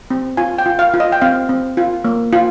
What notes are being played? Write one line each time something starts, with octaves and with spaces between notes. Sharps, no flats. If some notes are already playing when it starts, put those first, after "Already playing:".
C4
F4 G#5
G5
F4
F5
F4
D#5
G5
C4 F5
C4
F4
A#3
F4